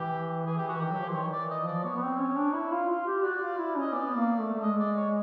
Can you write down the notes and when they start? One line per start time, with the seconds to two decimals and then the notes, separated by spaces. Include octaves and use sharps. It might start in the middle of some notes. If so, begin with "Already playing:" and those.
Already playing: E3 G4
0.46 E3 G#4
0.58 G4
0.69 F#4
0.74 E3
0.81 D#3 G4
0.90 F#3
0.99 F3
1.07 E3 C5
1.15 D#3 C#5
1.33 D5
1.38 E3
1.50 D#5
1.62 F3
1.67 D5
1.84 B3 C#5
1.96 B3
2.03 C4
2.19 C#4
2.37 D4
2.54 E4
2.72 F4
2.90 F4
3.07 G4
3.23 F#4 D5
3.41 F4
3.58 E4
3.76 C#4 D#5
3.93 B3 D5
4.16 A#3
4.40 A3
4.54 A3
4.62 G#3 D#5
4.80 D5
4.97 C#5